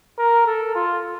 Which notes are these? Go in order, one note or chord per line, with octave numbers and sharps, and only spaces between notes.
A#4
A4
F4